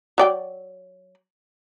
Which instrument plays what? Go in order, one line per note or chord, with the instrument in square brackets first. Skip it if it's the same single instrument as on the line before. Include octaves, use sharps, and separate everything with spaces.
[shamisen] F#3 D5 G5